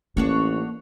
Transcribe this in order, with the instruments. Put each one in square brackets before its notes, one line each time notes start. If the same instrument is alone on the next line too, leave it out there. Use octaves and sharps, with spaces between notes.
[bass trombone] A1 [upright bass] A#3 [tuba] C#4 [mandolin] D4 F#4 C#5